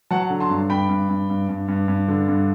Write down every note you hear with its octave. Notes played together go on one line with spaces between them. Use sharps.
F#3 F#5 A5
D3
A5 C6
G2
G2 G5 B5
G2
G2
G2
G2
G2
G2
D3
G2